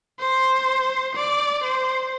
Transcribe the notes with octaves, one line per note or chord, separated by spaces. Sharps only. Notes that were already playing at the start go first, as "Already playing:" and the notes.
C5
D5
C5